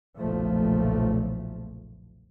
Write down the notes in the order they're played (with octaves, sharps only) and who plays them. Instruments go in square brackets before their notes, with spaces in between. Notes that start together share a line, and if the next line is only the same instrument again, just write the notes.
[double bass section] F#1 B1 A#2 F3 A3